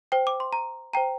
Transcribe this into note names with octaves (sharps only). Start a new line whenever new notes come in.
C5 G5
D6
C6
A#5
C5 G5 A#5